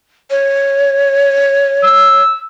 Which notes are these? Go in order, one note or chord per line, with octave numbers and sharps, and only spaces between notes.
C#5
E6